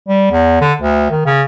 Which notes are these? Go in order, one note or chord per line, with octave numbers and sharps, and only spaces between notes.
G3
E2
D3
D2
D#3
C#3